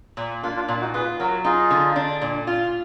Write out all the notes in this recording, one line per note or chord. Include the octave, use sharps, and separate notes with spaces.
A#2
A#3 D4 F4
D4 F4
A#2 D4 F4
D#4 F#4
F4 G#4 B4
F#3 F#4 A#4
D#4 F4 G#4
D3
D4
A#2
F4